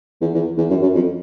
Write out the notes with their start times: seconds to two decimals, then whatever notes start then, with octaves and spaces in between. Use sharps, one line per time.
0.21 E2
0.34 E2
0.58 E2
0.70 F#2
0.82 F#2
0.95 F2